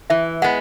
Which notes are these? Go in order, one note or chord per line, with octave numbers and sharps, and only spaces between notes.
E3 E5
G#3 B3 F#5